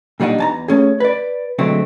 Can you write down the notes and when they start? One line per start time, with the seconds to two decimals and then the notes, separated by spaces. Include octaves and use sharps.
0.20 A#2 G3 D4 D#4 F#5
0.38 E2 A5 A#5
0.68 A3 C#4 G#4
1.00 B4 D5
1.59 D3 F#3 G#3 A3 C4